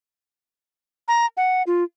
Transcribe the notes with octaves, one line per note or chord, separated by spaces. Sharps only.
A#5
F#5
F4